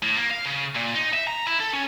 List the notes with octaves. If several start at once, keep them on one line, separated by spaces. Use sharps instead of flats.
A2
A#3
F5
C#3
A#2
D#4
E5
A#5
E4
A4
C#4